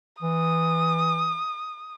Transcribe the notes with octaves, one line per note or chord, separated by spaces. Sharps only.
E3 D#6